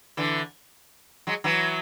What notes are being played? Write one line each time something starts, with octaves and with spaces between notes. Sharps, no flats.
D3 E3
F#3 G#3
E3 F#3